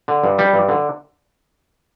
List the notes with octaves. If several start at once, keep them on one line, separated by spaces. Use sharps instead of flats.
D3
G2
G3
G2
D3